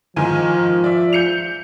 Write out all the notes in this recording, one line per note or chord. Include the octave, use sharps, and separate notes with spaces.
G#2 D#3 F3 G#5
D5 E5
G6 C#7 F7